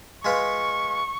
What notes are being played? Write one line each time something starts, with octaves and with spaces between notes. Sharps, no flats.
G#3 F4 B4 C#6